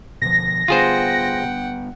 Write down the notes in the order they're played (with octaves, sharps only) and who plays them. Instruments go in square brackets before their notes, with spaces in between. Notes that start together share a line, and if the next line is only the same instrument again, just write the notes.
[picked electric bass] B2 D3 F3 [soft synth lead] A#6
[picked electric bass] D3 G3 B3 [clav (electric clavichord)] F4 G#4 C5 [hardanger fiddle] F#5 G5